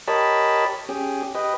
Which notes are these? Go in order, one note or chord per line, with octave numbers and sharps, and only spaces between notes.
G4 A#4 C#5 D#5 A5 B5
C#4 G4 G#4
G4 B4 D#5